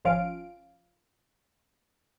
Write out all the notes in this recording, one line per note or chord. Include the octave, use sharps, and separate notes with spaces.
G#1 F3 C#4 F4 F5 D7